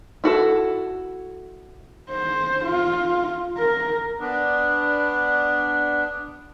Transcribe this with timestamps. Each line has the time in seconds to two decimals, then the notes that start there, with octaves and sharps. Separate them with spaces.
0.24 E4 F#4 A4
2.11 C5
2.66 F4
3.59 A#4
4.20 B3 D4